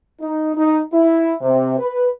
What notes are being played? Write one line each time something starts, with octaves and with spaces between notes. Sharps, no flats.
D#4
D#4
E4
C3
B4